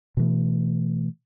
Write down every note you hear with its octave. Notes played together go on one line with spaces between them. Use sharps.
B2 E3 A3